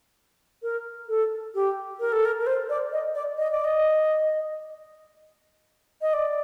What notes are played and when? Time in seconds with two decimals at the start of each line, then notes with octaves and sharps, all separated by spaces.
0.63 A#4
1.09 A4
1.55 G4
2.00 A#4
2.12 A4
2.25 A#4
2.40 A#4
2.47 C5
2.69 D5
2.92 D#5
3.15 D5
3.38 D#5
3.51 D5
3.64 D#5
6.02 D#5
6.13 D5